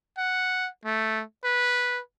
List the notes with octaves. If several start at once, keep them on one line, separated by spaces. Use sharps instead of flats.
F#5
A3
B4